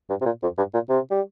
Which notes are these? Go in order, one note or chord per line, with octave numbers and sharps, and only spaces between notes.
G2
C3
A#2
F2
G2
A#2
C3
G3